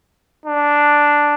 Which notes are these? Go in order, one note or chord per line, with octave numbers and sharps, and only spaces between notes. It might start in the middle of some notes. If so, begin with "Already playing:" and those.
D4